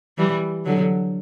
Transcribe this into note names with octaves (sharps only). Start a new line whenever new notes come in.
E3 G3
D3 F#3